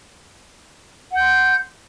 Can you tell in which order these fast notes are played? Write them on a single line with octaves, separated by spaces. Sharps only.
F#5 G6 C6